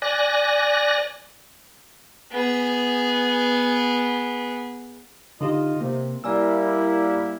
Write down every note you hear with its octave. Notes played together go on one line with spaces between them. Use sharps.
D5 G#5 F#6 A#6
B3 G#4
D3 D#4 F4 G4 D#5
C3 A#3
G3 A#3 E4 D5 G#5 E6